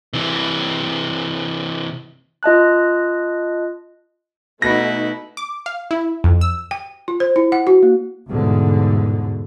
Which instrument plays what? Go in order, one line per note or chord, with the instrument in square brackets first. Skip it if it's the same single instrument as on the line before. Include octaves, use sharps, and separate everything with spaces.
[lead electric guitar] C3 E3
[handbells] F4 D#5 A5 F#6
[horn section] B2 [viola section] A3 D#4 [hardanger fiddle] E4 [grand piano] A#6
[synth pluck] D6
F5
E4
F2
E6
[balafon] G5
F4
C5
E4
F#5
F#4
A#3
[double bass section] G1 E2 G#2 B2 D3